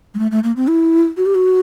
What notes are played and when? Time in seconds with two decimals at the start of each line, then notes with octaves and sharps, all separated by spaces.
0.14 G#3
0.19 A3
0.31 A3
0.44 A#3
0.56 C4
0.68 E4
1.17 F#4
1.26 G4
1.35 F#4